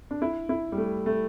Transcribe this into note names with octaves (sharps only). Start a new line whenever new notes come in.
D4
E4
E4
G3
A3
A3